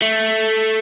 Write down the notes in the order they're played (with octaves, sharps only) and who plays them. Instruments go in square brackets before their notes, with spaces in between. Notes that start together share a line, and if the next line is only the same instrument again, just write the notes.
[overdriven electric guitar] A3